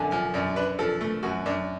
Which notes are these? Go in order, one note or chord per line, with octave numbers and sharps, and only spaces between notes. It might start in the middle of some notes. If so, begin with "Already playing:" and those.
Already playing: F#2 D3 G#5 A5
F3 G#5
F#2 D5
D4 B4
F3 A4
A3
F#2 F#4
F#2 D4